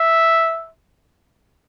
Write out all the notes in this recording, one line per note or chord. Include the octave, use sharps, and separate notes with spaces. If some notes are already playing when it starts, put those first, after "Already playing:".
Already playing: E5